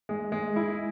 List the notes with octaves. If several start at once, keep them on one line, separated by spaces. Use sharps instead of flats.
G#3
G#3
E4